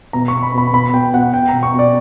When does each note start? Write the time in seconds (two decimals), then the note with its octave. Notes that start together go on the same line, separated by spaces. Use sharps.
0.13 B2 A#5
0.28 B2 C#6
0.43 B5
0.54 B2 B5
0.73 B2 B5
0.93 B2 G5
1.13 B2 F#5
1.34 B2 G5
1.49 B2 A#5
1.63 C#6
1.74 B2
1.79 D5